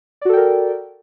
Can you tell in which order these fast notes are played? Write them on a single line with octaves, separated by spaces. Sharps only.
D5 F#4 A4 G5 A#4